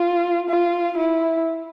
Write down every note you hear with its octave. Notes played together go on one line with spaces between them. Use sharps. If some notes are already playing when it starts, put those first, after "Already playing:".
Already playing: F4
F4
E4